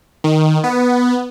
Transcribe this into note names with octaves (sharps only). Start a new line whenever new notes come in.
D#3
B3